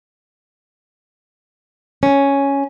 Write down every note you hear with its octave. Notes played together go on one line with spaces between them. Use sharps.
C#4